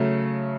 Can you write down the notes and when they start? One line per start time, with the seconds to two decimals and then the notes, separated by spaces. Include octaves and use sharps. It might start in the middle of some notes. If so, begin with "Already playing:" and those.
Already playing: C#3 F#3 A3